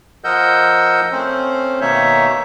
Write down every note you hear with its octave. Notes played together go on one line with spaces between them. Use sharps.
F3 A#4 D#5 F#5 E6 G6
A3 C4 C#4 C5
B2 D#3 A#3 D#4 C#5 E5